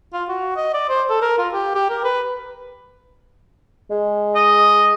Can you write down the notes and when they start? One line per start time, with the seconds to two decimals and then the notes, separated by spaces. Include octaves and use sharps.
0.13 F4
0.29 F#4
0.56 D#5
0.74 D5
0.89 C5
1.10 A4
1.22 A#4
1.38 F4
1.53 G4
1.75 G4
1.90 A#4
2.04 B4
3.90 G#3
4.35 D#5